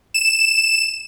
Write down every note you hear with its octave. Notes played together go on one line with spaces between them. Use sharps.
E7